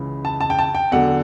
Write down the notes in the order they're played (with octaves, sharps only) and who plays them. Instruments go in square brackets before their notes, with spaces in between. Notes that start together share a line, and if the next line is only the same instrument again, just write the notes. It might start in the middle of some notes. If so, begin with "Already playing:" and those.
Already playing: [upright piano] C#2 C#3 E3
A5
A5
G5
A5
G5
E2 D3 F#3 F#5